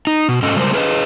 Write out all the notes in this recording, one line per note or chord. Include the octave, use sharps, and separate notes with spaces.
D#4
B2
G#2 F#3 C#4 A4 D#5
C#3 G3 G#3 A#4 C5
G#4 B4 C#5 D#5